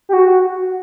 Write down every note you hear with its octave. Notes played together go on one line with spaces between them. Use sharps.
G4
F#4